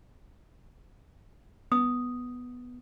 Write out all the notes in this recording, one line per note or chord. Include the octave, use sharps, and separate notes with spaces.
B3 D#6